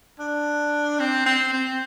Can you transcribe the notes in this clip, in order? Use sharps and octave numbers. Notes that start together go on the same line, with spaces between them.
D4
C4
C4
C4